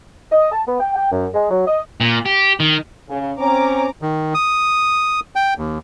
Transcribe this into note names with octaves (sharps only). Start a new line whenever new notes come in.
D#5
A5
B3
G5
G5
F#2
G#3
F#3
D#5
A#2
G4
D#3
C#3
C4 C#4 A#5 D6
D#3
D#6
G5
D#2